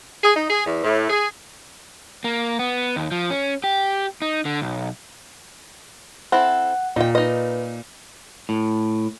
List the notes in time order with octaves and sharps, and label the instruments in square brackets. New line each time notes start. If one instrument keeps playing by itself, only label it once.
[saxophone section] G#4
D#4
G#4
E2
A2
G#4
[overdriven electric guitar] A#3
B3
D#2
F3
C#4
G4
D#4
D3
B1
[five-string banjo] C4 E4 A4 [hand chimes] F#5
[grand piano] A#2 [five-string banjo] D#4 G5
[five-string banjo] D#4 D#5 [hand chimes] B4
[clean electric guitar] A2